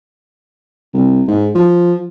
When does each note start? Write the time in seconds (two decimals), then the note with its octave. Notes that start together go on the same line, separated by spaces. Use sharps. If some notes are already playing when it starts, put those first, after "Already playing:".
0.93 C2
1.27 G#2
1.55 F3